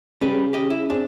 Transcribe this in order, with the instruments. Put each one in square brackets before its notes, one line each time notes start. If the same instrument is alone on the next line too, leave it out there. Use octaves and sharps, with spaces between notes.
[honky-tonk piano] C#3 [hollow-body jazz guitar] G3 B4
[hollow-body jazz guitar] G4 D#5
E4
[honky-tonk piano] C4 G#4 [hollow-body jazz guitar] D4